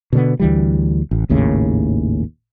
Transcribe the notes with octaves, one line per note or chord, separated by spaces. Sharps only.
B2 D3 B3
D2 E3 G3
A1
G#1 D#2 A2 C#3